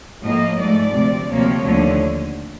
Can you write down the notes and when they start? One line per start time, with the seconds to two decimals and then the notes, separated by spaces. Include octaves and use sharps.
0.24 A2 F3 A#3 D#5
0.59 G#2 F3 A3 D5
0.94 D2 C3 F3
1.29 D2 C3 F3 A#3 C#5
1.64 D#2 D3 F3 A3